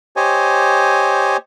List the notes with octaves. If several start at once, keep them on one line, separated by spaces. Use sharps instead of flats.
G4 C5 C#5 D#5 G#5